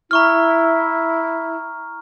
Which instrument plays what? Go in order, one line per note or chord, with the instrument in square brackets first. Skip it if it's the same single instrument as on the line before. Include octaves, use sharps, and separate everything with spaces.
[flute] E4 [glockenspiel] A#5 C#6 F6